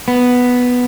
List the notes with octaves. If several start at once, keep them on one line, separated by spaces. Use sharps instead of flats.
B3